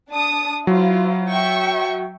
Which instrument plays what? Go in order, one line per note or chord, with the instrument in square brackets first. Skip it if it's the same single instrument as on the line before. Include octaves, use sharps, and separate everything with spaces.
[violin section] D4 A5 D#6
[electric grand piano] F#3 [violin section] E4 F4 C5
[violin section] E5 G5 C#6